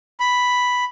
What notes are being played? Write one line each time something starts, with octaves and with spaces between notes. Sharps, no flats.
B5